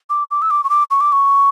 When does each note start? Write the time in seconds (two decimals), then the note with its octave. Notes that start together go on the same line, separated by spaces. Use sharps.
0.10 D6
0.31 D6
0.42 E6
0.51 D6
0.64 C#6
0.70 D6
0.91 C#6
1.01 D6
1.12 C#6